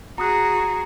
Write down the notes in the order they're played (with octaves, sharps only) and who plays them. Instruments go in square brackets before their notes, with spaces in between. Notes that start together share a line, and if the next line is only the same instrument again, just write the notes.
[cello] F#4 G#4 [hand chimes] A#5 D#6 F#6